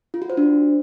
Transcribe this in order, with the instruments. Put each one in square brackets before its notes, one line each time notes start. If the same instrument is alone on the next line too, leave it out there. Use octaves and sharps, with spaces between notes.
[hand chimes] F4
F#4
C5
D4